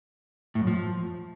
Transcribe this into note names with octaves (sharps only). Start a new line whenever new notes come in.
A2
F#2
F3